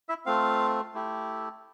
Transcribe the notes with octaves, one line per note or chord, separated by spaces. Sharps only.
E4 E5
A3 C4 F4 F5
A3 E4 G4